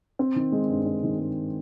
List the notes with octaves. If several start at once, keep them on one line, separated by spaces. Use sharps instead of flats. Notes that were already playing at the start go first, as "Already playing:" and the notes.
C4
D#3
G#3
G2
C4
D#3
G#3